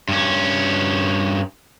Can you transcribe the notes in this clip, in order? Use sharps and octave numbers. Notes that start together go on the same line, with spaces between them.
G2 C#4